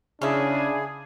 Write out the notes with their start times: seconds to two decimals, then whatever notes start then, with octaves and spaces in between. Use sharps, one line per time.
0.22 C#3 C#4 D4 E4 G#4